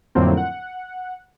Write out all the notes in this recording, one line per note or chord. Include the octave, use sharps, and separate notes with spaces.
F2 A2 D3 F#3 A#3 C4
F#5